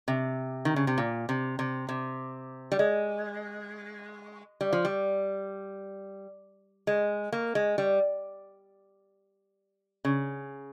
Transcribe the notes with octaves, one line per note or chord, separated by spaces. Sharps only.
C3
D#3
C#3
C3
A#2
C3
C3
C3
G3
G#3
G3
F3
G3
G#3
A#3
G#3
G3
C#3